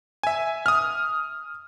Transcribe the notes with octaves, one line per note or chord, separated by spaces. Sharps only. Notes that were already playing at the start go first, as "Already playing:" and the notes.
E5 G#5
D#6 F6